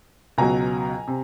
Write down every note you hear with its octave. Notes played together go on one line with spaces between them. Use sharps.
C#2 B2 F#3 G#5 A#5
C3